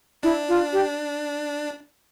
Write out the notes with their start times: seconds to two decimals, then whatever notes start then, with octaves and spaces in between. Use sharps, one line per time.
0.23 D4 E4
0.49 F4
0.73 G4